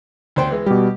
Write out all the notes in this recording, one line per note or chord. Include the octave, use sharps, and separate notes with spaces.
D2 C5 G5
E3 G#3
B2 G3 G4